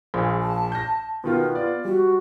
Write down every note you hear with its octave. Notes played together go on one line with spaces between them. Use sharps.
A#1 A#2 G#4
A5
G6 A#6
B2 D#3 B3 F4
F4 D5
G3 F#4